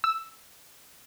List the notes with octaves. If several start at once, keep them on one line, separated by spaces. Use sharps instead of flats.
E6